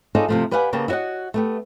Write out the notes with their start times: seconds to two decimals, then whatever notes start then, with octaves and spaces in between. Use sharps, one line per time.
0.15 D#4 F4 G#4 A4 C#5 D5
0.29 C3 F3 A3
0.51 G4 B4 D5 F5 F#5 G#5
0.73 C#3 A#3 B3 G4 A5
0.88 E4 F#4 C#5 D#5 F#5
1.34 A3 B3 G4